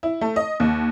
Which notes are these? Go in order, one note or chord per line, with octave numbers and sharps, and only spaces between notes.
E4
A3
D#5
D#2